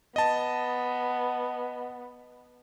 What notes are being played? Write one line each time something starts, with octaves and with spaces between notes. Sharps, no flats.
B3 D#5 A5